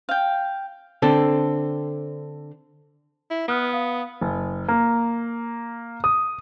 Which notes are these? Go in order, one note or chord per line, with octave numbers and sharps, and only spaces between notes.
F5 G5
D3 C4 A4
E4
B3 D#6 F6 F#6
F5 D#6
F#1
A#3
D#6